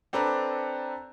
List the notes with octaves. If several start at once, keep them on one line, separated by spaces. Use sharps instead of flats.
C4 D4 A4 B4 A#5